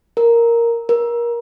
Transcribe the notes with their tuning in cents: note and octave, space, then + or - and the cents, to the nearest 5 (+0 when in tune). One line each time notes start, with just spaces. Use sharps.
A#4 +0
A#4 +25